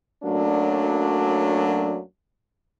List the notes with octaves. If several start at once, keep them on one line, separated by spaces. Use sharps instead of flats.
F#2 F#3 A3 A#3 D4